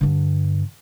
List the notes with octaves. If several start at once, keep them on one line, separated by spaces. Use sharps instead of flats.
G2 D3